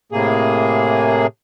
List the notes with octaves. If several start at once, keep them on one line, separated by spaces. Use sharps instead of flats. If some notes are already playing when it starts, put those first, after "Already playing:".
A2 C3 A#3 G#4